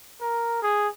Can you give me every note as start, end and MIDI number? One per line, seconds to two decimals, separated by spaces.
0.21 0.61 70
0.62 0.87 68